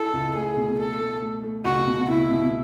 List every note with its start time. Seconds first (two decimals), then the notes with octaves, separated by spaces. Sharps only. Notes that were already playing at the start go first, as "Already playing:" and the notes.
Already playing: E4 A4
0.13 C#2
0.35 A3 G#4
0.57 B2
0.79 A3 A4
1.00 A3
1.21 A3
1.43 A3
1.65 C#2 F#4
1.86 B2
2.08 C#2 E4
2.31 B2